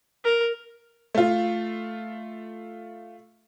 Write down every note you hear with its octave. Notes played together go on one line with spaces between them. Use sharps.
A#4
A3 F4